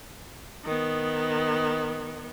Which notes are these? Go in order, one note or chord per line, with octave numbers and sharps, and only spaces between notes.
D#3 B3